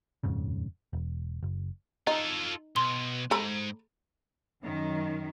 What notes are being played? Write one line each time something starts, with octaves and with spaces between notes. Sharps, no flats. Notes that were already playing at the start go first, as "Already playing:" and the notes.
D#1 F2 G#2 C#3
E1
F#1
D#4 F4 A4 D#5
B1 C6 G7
G#2 A4 A#5 B5
F#2 D#3